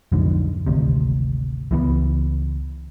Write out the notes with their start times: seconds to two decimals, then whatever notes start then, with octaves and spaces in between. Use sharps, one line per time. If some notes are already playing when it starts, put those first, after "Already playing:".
0.12 B1 F2 G#2 D3
0.67 G#1 D2 C3
1.71 C#2 E3 G#3 B3